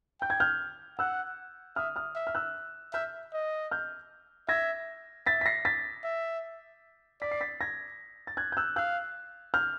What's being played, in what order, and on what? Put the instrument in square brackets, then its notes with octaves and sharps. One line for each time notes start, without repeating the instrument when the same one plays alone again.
[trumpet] G5 [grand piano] G6
[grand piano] G#6
F6 G6
[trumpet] F#5 [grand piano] E6 F#6
[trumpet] E5 [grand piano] D#6 F6
[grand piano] D#6 F6
[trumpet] E5
[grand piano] F6
E6 F#6
[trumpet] E5 [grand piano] F6 G6
[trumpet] D#5
[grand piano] F6 G6
[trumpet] E5 [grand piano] G#6 A#6
[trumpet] E5 [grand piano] A6 B6
[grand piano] B6
A#6 C7
A6 B6
[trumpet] E5
[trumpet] D5 [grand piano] B6
[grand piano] C7
A6 B6
G#6 A#6
A6
F#6 G#6
G6
E6 F#6
[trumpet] F5 [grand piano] E6 F#6
[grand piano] F6 G6